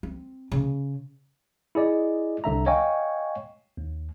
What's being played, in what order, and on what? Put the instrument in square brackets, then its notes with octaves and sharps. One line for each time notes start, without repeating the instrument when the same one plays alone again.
[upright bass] C4
C#3
[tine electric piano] E4 G#4 D5 D#5
C2 D3 E5 A#5
C#5 D#5 F5 G5 G#5 C#6
D#2